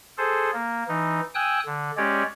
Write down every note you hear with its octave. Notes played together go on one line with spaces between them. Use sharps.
G#4 A4 C5
A#3
E3 D#4
G5 G#5 D#6 E6 F#6
D3
G#3 C#4 G4 C#5 D5